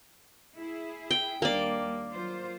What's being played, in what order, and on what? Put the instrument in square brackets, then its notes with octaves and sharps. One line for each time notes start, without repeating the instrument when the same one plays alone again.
[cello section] E4 G#4
[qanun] G5
[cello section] D#2 G3 D4 [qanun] A#3 D5
[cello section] F#3 F4 C5